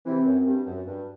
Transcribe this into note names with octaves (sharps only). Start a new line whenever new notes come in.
C3 E3 C4
F#2
G2
F#2
G2